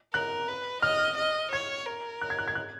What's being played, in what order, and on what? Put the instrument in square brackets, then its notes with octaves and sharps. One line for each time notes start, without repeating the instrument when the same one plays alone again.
[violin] A#4 [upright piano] F#6
[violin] B4
[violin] D#5 [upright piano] F6
[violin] D#5
[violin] C#5 [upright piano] G#6
[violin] A#4
[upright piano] F#6
G#6
F#6
G#6
F#6